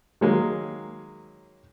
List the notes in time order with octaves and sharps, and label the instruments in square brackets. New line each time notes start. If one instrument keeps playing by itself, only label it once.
[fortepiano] D#3 F#3 G#3 A#3